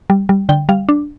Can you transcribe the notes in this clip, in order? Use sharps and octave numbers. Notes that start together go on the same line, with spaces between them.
G3
G3
D3 G5
G3 F5
D4